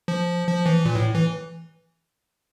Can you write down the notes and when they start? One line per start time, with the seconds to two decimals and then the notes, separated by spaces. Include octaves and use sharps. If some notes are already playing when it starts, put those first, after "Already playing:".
0.08 F3
0.47 F3
0.66 E3
0.85 A#2
0.95 A2
1.15 E3